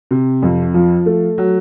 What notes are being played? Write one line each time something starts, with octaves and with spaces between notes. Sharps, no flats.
C3
F2
F3
A3
F#3